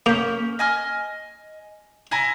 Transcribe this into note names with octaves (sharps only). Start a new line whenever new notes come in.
A#3 C#4 G6
D#5 G#5 F6
E4 G#5 A#5